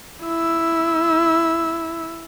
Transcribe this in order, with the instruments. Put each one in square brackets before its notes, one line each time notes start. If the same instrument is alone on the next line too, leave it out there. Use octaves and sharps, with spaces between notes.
[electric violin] E4 E6